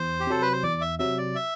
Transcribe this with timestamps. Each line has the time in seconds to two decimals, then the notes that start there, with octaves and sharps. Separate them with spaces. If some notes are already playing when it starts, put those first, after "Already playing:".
Already playing: E2 C5
0.20 G4
0.27 C3 F#3 A4
0.42 B4
0.53 C5
0.63 E2 D5
0.81 E5
0.99 C3 F#3 E5
1.18 D5
1.35 E5